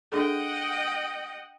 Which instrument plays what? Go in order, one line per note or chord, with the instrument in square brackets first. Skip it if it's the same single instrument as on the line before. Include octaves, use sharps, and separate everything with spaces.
[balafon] D4 G#4 A4 [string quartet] D#5 F#5 G5